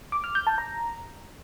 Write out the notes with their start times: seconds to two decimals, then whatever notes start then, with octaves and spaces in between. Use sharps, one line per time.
0.12 D6
0.24 F6
0.35 G6
0.47 A5
0.58 A#5